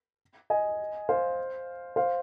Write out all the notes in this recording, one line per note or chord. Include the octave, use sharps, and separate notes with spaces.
D#5 G#5
C5 F5
C5 F5